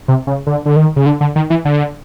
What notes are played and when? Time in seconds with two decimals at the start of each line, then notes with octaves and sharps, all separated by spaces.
0.08 C3
0.27 C#3
0.47 D3
0.66 D3
0.76 D#3
0.96 C#3
1.06 D3
1.21 D3
1.36 D#3
1.50 E3
1.65 D3